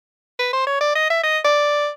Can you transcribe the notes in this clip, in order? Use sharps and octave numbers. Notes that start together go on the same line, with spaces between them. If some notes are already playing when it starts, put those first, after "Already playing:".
B4
C5
C#5
D5
D#5
E5
D#5
D5